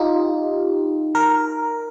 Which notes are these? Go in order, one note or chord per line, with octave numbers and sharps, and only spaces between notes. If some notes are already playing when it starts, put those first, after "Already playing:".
Already playing: D#4 F4 G4
A#4